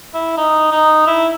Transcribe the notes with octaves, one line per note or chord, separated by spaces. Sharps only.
E4
D#4
D#4
E4